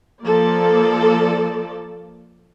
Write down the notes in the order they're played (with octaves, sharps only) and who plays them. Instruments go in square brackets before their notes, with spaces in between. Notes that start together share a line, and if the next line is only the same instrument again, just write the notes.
[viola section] F3 A#3 A4 D5